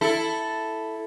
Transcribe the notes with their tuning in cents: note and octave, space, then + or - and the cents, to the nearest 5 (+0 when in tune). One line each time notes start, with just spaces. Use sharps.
E4 +0 A4 +0